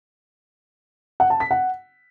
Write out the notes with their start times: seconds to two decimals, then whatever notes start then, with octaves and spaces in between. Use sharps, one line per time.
1.20 F#5
1.30 A5
1.40 B6
1.51 F#5